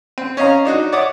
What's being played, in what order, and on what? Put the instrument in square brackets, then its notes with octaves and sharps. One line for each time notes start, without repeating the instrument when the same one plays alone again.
[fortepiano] C4
C#4 C#5 D#5 F5 A#5
D4 D#4 F#4
C#5 D5 E5 F#5 D6 D#6